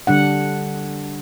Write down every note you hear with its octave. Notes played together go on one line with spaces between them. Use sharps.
D3 G3 D4 F#5